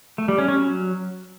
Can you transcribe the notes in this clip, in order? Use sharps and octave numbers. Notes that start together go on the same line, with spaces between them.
A3
G3
C#4
C#4
F#3